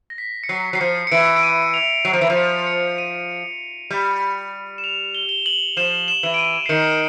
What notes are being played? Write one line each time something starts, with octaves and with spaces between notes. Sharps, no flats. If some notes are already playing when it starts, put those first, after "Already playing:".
A#6
B6
C#7
F#3 C7
F#3 C7
F3 C#7
C#7
E3 D7
D7
D#7
F7
F#3 D#7
F3
E3
F3 D7
C#7
C#7
D#7
G3
E7
F7
G7
G7
F#7
F3 E7
E7
E3
D7
D#7
C7
D#3 C#7